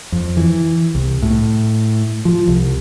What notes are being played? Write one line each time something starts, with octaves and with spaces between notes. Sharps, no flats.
F2
E3
C2
A2
F3
C2